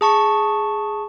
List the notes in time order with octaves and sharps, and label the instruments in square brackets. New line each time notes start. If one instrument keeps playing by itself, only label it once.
[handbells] G#4 A5 C#6